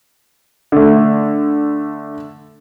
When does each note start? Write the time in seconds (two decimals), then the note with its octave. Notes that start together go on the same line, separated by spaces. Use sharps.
0.72 D3 A3